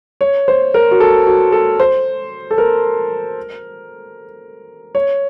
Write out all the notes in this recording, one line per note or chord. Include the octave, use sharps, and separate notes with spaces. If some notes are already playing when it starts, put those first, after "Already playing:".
C#5
C5
A#4
F#4
A4
F#4
A4
C5
A4
A#4
C#5